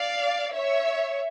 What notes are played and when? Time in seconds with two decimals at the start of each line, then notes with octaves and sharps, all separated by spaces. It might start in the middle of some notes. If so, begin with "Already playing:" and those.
Already playing: D5 F5
0.53 C#5 E5